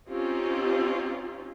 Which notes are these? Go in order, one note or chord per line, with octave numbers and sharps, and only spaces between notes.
C4 C#4 D#4 F4 G4